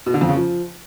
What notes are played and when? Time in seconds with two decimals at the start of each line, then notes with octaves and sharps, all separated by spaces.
0.06 B2
0.14 D3
0.21 F2
0.29 C#3
0.36 F3